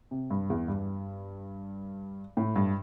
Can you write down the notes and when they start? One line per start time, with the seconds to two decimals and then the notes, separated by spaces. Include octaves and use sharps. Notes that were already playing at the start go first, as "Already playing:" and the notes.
0.11 C3
0.30 G2
0.50 E2
0.68 G2
2.37 A2
2.56 G2